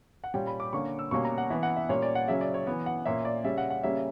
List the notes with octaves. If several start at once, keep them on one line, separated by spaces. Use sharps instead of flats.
F#5
A#2 G3 C#4 G5
B5
D6
D3 A#3 C#4 C#6
E6
B2 G3 A#3 C#4 C#6
A#5
F#5
E3 B3 E5
F#5
E5
A#2 G3 A#3 C#4 C#5
D5
F#5
C#3 F#3 C#4 E5
D5
C#5
E3 B3
F#5
A#2 A#3 C#4 E5
D5
C#3 G3 C#4 E5
F#5
F#5
C#3 G3 A#3 C#4 E5